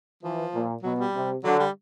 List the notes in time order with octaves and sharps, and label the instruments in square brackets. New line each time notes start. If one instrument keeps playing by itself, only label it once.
[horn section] E3 [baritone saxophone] F3
[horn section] A#2
[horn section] B2 [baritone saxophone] F#3
[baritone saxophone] G3
[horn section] C3
[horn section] D3 [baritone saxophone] F#3
[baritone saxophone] G3